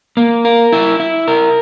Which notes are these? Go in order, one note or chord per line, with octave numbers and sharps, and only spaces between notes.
A#3
A#4
E4
E4
A#4